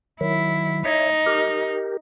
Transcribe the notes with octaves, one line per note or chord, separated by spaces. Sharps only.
D#3 F#3 E4
D#4 C#5 E5
G4 A#4